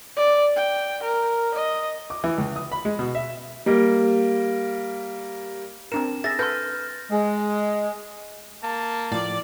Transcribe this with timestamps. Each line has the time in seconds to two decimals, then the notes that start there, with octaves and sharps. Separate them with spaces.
0.16 D5
0.56 G5
1.03 A#4
1.54 D#5
2.10 D6
2.24 E3
2.38 C#2
2.56 D#6
2.72 B5
2.85 G#3
2.99 B2
3.15 E5
3.66 G3 A#3
5.92 C4 D4 A#4 E7
6.24 G#4 E5 A6 A#6
6.39 A4 B4 C6 F6 G6
7.10 G#3
8.63 A#3 A5
9.12 A2 F3 D5